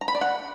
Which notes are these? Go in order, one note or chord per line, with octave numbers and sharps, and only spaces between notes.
A#5
B5
D5
F#5